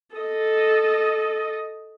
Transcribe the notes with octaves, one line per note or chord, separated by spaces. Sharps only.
A4 D#5